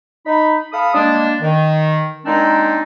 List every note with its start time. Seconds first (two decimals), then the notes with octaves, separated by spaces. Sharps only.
0.25 D#4 B5
0.72 A4 F5 B5 D#6
0.94 G3 G#3 A#3 D4
1.40 D#3
2.25 A#2 G#3 C4 D4 D#4